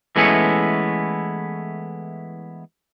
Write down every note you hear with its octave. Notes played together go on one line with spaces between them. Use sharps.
E3 G#3 A3 B3 C#4 E4